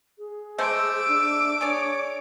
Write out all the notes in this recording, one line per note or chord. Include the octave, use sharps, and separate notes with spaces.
G#4
G#3 A3 C5 D6 E6
D4
G#4 C#5 D5